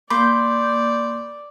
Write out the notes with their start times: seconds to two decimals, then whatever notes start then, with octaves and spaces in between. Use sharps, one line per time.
0.10 A#3 D5 B5 C6 D6 G6